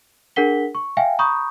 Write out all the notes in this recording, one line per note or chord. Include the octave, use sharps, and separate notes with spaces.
D4 G#4 A#4 F#5 B6 G7
C#6
E5 F5 G5 G#5
A#5 B5 C#6 D#6 G6